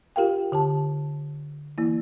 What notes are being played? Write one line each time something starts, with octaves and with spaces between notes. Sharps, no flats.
F4 G4 A#4 F5 G5
D3 G4 A5
E3 A#3 E4